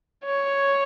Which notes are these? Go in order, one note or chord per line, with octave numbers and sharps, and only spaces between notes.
C#5